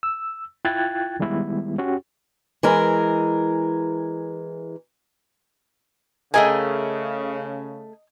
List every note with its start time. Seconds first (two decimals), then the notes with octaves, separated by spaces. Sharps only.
0.03 E6
0.65 E4 F4 G5 F#6 G#6 A6
1.20 D#3 G3 G#3 B3 E4
1.78 C#4 F#4 G4
2.63 E3 G#3 A#4
6.34 C#3 A3 G#4 A#4 D#5 G5 G#5